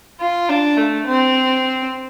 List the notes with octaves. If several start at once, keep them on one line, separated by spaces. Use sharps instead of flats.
F4
D4
A3
C4